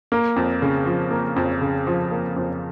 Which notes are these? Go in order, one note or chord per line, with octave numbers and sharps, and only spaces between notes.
A#3
F2
C#3
F3
A#3
F2
C#3
F3
A#3
F2